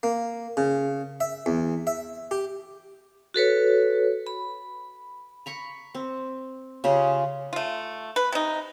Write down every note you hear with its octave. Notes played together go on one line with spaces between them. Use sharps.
A#3
C#3
E5
E2
E5
G4
F#4 A4 B4 C#5
B5
A#5 B5 C#6
C4
C#3 F4 G4 G#4
A3 F4
B4
C3 D#4